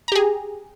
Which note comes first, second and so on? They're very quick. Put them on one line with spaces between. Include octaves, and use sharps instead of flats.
A#5 G4 G#4